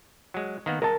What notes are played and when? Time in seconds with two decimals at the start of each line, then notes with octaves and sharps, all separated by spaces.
0.34 F#3 G#3
0.66 D#3 A#3 B3
0.82 G#3 A#4 A5